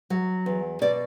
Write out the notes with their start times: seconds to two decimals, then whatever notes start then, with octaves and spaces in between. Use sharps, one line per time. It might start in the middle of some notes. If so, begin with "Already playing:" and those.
0.10 F#3
0.46 E2
0.81 B2 D5